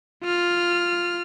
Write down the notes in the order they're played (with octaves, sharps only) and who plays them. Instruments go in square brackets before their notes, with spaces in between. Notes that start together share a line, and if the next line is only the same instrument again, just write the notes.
[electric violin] F4 F6